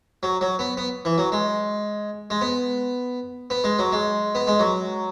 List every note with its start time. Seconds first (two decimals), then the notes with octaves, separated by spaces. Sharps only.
0.23 F#3
0.41 F#3
0.59 B3
0.77 B3
1.05 E3
1.18 F#3
1.32 G#3
2.30 G#3
2.41 B3
3.50 B3
3.64 G#3
3.79 F#3
3.92 G#3
4.35 B3
4.47 G#3
4.60 F#3